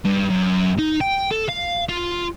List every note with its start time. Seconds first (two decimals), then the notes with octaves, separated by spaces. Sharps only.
0.05 G2
0.30 F#2
0.78 D#4
1.01 G5
1.31 A4
1.49 F5
1.89 F4